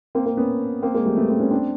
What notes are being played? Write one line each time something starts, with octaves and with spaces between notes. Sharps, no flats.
A#3 C4
A#3 C4
B3 C#4
A#3 C4
G#3 A#3
G3 A3
A3 B3
A#3 C4
B3 C#4
C4 D4